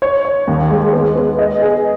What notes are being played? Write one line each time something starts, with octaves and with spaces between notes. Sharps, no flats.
C#5
C#5
D#2
G#3
B3
B3
D#5
G#4